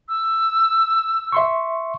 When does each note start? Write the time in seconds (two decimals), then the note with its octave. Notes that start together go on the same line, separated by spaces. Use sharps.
0.08 E6
1.32 E5 C6 C#6